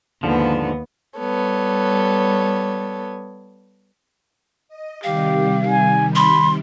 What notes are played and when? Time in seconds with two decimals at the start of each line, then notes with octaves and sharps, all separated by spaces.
0.23 D#2 G#2 D3 F3 B3
1.18 G3 B3 A4 C#5
4.68 D#5
5.03 C3 D#3 G3 G4 F5
5.67 G#5
6.16 B5 C6